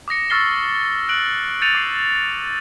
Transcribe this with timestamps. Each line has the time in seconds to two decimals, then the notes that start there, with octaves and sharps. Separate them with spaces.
0.08 D6 D#6 A#6 C#7
0.30 C#6 E6 F6 A6 C7 G7
1.09 F#6 D7 F#7
1.62 G6 A6 C#7 D#7 F7
1.75 D6 C7